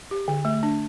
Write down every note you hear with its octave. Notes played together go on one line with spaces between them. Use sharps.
G4
D3
A3
D4